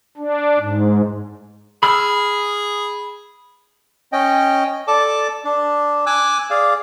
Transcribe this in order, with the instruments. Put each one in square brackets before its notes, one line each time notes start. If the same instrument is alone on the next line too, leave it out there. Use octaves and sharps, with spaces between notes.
[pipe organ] D4
G#2
[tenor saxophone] G#4 [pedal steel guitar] B5 E6 F6
[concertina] C#4 D#5 G5
A4 D5 A5 D6
D4
G#5 D6 E6 F#6
G#4 D5 F5